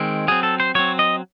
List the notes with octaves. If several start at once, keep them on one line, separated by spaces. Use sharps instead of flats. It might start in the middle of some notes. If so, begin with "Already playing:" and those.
Already playing: D#3 G#3 C4
F#3 C4 G#4
A4
C5
F#3 C4 C#5
D#5